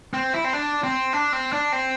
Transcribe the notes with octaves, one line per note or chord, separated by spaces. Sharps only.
C4
E4
C4
D4
C4
D4
C4
D4
C4